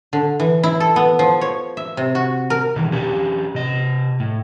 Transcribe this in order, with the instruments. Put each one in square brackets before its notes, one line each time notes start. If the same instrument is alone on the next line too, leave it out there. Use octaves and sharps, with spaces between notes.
[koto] D3
E3
E4
A4
B3
F3
C#5
E5
C3
F#4
A#4
[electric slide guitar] B2 D#3 E3
C#4 D4 G4
C3 D#5
A2